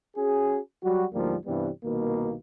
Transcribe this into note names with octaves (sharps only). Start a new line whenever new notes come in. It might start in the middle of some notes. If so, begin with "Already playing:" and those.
C#4 F#4 G#4
F#3 G3 F#4
D2 G#2 F3 G3 A#3
G2 C3 E3 G3 B3
C2 B2 D#3 A#3